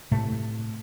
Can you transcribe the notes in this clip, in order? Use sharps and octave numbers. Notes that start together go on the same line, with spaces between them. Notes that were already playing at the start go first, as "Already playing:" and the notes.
A2 C3 A3